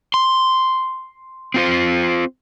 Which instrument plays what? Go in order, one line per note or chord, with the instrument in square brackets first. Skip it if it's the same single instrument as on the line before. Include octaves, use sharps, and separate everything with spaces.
[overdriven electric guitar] C6
[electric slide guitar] C4 F4 C5